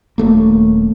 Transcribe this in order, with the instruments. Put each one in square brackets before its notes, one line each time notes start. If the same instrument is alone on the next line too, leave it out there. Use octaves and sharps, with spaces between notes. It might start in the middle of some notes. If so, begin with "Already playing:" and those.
[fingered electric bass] D#1 A3 A#3